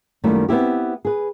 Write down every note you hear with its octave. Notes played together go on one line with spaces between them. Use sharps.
F#2 D#3 G3 A3 A#3 E4
B3 C4 E4 G4
G#4 B4